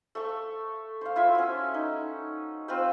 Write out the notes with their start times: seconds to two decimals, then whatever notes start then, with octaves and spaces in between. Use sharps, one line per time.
0.15 A3 C#6
1.01 C5 F5
1.16 E4 F4 C5 E5
1.35 C#4 F#4
1.74 D#4
2.68 C4 F4 B4 C5